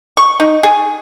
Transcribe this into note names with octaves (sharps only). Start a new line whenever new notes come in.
C#6
D#4
G#4